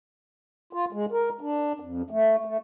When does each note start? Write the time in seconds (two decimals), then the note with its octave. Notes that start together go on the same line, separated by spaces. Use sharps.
0.73 F4
0.92 G#3
1.12 A#4
1.41 D4
1.80 F2
2.10 A3
2.45 A3